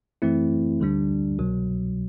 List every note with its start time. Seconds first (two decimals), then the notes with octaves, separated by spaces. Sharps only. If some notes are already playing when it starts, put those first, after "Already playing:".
0.22 F#2 E3 A3 C4 E4
0.80 D2 D3 G3 D4
1.39 C2 B2 F#3